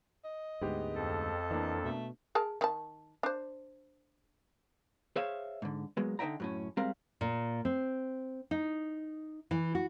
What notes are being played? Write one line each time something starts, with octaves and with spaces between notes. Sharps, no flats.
D#5
D2 G#2 G#3 B3 G4
F2 A4
E3 A#3 D4
B2 A3
G#4 A#4 A5
D#3 A5
D4 C5
G#4 C5 C#5 E5 F5
G#2 D3
F#3 G#3 A#3 B3
D3 D#4 C5 E5 G5 A#5
F#2 A2 C#4
G3 G#3 C4 A#4 F5 A#5
A#2
C4
D#4
E3
F#4